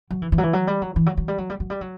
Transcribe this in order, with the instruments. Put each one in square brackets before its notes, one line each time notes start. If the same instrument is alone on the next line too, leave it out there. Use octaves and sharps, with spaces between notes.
[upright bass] F#3
E3
E3
F#3
E3
F#3
G3
F#3
E3
F#3
F#3
G3
F#3
G3
F#3
G3
F#3